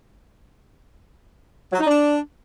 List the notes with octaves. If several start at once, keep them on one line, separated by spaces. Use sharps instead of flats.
F#3
D#4
D4